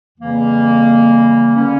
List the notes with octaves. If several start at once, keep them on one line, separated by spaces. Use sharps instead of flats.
F2 C#3 E3 G3 A#3
D3 G3 A#3 C#4